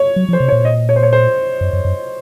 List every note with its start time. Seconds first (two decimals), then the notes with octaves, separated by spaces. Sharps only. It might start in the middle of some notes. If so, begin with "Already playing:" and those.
Already playing: C#5
0.16 F#3
0.29 F3
0.33 C5
0.40 C3
0.48 C#5
0.52 A#2
0.65 D#5
0.89 C#5
0.96 C5
1.03 C#5
1.13 C5
1.61 F#2
1.73 F#2
1.85 F#2